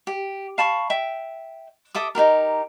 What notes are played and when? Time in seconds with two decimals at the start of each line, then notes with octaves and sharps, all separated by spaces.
0.07 G4
0.58 F5 A5 B5 C#6
0.90 E5 G5
1.95 A4 E5 D6 D#6
2.15 D#4 E4 G4 A#4